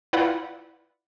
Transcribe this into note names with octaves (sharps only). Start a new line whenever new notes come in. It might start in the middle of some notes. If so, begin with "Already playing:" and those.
E4 F4 B4 D5 F#5